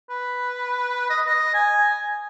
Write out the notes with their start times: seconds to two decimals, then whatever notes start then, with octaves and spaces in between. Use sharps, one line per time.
0.10 B4
1.10 D#5
1.27 D#5
1.54 G#5